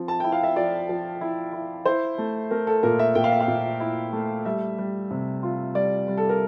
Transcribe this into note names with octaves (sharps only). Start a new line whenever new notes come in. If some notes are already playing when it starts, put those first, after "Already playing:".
Already playing: F3 C4
A5
E4 G5
F5
E5
F3 D5
F3
E4
E4
E4 C5
A3
A3 A#4
A4
A#2 A#4
E5
A#2 G5
F5
E5
F5
A#2
E4
A3
G3 E5
G3
C3
F4
G3 D5
G3
A4
A#4